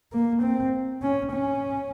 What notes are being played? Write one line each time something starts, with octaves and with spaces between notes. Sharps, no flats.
A#3
C4
C#4
C#4